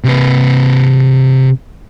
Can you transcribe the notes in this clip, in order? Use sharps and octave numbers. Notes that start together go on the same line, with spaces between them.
C3 B4